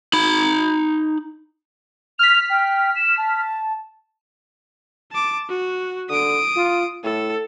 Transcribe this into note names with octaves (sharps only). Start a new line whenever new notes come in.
D#4 B5
F6 B6 F7
G5
E7
A5
A5 D6
F#4
D3 D#6 D7
F4
A2 A4